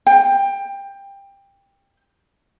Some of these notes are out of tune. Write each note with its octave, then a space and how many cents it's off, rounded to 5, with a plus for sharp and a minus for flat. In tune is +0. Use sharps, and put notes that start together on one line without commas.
G5 +20